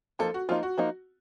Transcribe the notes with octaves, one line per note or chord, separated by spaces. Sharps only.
F3 A#3 D#4 A4
F#4
F3 A#3 D#4 F4
F#4
F3 A#3 D#4